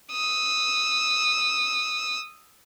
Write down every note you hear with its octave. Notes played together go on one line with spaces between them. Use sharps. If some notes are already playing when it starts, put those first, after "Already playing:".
D#6 E6